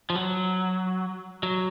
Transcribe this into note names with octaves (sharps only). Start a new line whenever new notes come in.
F3
F#3
F#3